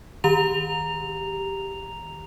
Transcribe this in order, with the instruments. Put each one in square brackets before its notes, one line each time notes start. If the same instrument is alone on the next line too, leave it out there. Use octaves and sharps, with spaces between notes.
[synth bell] D#3 G4 A#5 F7